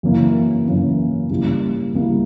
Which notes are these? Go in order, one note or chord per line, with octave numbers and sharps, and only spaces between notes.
F#2 C#3 E3 A#3 E4
F#2 C#3 E3 A#3 E4
C#3 G3 A#3 E4
C#3 G3 A#3 E4